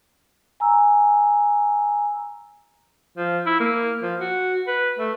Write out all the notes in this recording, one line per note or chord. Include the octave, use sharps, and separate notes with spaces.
G#5 A#5 E6
F3
E4
A#3
F3
F#4
B4
A3